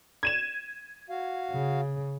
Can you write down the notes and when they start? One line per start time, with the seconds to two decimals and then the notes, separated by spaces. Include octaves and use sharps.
0.23 G#6 D#7 E7
1.10 F#4 F5
1.51 C#3